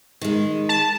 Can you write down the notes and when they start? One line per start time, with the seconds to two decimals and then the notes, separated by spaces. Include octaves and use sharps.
0.21 D#3 G#3
0.69 A5